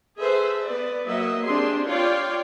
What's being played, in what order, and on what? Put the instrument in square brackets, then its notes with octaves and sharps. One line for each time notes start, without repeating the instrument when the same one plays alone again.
[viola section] G#4 A4 B4 C5 E5
B3 B4 D5
F#3 A#3 D#5 E5
C4 D4 G4 G#4 C6
F4 C#5 D5 F5 G5